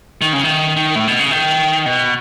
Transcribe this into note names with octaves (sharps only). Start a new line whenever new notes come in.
D#3
C#3
D#3
D#3
A2
B2
C#3
D#3
B2